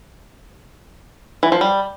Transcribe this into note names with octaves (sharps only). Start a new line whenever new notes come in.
E3
F3
G3